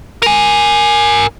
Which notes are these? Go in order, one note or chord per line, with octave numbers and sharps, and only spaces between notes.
A#4 G#5